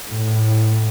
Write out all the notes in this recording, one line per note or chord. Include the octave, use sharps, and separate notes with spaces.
A2